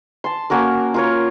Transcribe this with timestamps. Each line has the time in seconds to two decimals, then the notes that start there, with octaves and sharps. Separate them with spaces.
0.24 A5 C6
0.50 A#3 C#4 F#4 A#4
0.94 F4 A#4 C#5